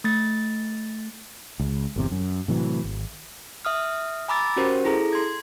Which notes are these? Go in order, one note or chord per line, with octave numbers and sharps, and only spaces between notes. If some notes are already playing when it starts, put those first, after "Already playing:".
A3 A6
C#2
G1 E2 C3
F#2
A2 C3 E3 F#3
G#1
E5 D#6 F6
G#5 A#5 B5 D6 E6 A6
C#4 F#4 G4 A#4 C5
E4 G#4 A4 A#5
C6 G#6